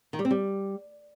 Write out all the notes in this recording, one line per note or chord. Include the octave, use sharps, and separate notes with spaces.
D#3
G3
C4
G3